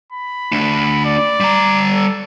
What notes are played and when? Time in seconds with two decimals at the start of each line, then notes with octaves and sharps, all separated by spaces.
0.12 B5
0.52 A3 D4
1.05 D5
1.40 G3 A#5
1.93 A4